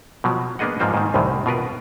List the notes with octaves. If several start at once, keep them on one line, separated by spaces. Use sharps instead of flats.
B2 F3 F#3
A#3 B3 D4 G#4 D#5 F#5
G#2 F3 A#3 C4 F4 C5
G#2 D#3
C2 F#2 A2 D#3 E3
B2 F4 A#4 B4